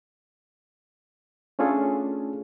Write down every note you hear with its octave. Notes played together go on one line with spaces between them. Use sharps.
A3 C#4 D4 F4 G#4 A4